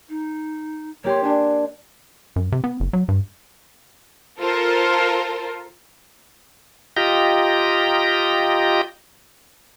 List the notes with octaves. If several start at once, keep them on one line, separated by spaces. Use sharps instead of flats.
D#4
A#3 G4 C#5 C6
D4 D5 G#5
F#2
C3
B3
F#1
F#3
G2
F4 A4 A#4 C5
F4 G4 D#5 G5 A#5